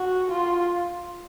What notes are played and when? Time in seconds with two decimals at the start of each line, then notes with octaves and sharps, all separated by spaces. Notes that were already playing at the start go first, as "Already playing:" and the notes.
Already playing: F#4
0.31 F4